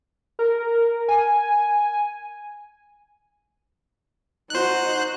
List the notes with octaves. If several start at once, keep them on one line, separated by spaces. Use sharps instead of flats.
A#4
G#5
D#4 F#4 C5 F#6